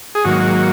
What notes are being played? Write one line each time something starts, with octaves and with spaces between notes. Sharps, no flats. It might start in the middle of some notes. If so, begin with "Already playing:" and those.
G#4
G#2 D#3 F#3 A#3 F#4